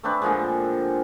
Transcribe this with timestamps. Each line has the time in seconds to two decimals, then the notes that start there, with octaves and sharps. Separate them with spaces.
0.03 A3 C4 D4 B4
0.22 A#2 D3 F3 G#3